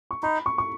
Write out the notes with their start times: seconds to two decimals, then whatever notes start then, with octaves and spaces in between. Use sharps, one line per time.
0.11 C#6
0.23 D#4 B5
0.46 C#6
0.58 C#6